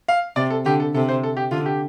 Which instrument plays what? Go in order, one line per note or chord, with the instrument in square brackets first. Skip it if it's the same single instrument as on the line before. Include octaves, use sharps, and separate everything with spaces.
[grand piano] F5
[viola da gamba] C3 [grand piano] D5
[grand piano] A4
[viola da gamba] D3 [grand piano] G4
[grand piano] A4
[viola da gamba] C3 [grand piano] A4
[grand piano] C5
A4
G4
[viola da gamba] D3 [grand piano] F4
[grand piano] G4